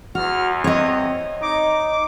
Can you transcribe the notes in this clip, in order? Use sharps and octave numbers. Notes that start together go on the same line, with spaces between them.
E2 F#4 F6
C4 C#5 D#5
D#4 D6